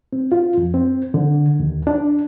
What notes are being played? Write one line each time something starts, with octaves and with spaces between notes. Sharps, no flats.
C4
F4
F2
C4
D3
D#2
D4